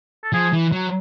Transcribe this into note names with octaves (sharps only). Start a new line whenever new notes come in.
A4
F3 G#4
E3
F#3